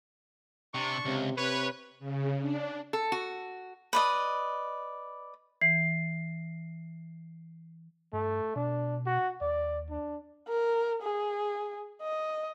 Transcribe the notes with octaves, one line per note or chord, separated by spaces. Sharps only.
C3 D4 A5 C#6
C#2 C3
C3 B4 C#5
C#3
D4
A4
F#4
B4 D5 D#5
E3 C7
G2 A3
B2 D4
F#4
D#2 D5
D4
A#4
G#4
D#5